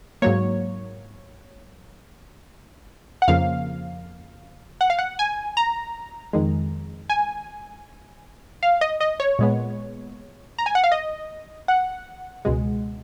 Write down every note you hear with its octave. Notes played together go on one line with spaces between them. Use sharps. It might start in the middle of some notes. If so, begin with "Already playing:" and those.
G#2 F#3 A#3 C#5
F#5
F2 C#3 F3 A#3 F5
F#5
F5
F#5
G#5
A#5
F2 D#3 G#3
G#5
F5
D#5
D#5
C#5
A#2 G#3 B3
A#5
G#5
F#5
F5
D#5
F#5
C#2 B2 G#3